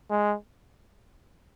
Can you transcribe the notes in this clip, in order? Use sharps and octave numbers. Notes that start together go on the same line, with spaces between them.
G#3